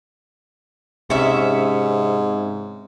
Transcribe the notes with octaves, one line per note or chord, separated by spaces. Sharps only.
G#2 C3 C#4 E5